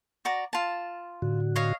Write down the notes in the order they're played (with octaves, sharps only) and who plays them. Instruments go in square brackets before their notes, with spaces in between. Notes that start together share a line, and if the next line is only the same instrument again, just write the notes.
[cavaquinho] F#4 D5 A#5
F4 A5
[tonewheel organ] A2 D3 F#4
[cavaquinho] C#5 D#5 F5